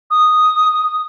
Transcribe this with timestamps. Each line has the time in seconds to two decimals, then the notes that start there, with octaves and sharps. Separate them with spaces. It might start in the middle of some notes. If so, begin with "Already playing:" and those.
0.10 D#6